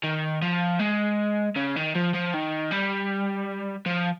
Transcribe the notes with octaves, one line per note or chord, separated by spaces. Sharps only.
D#3
F3
G#3
C#3
D#3
F3
F3
D#3
G3
F3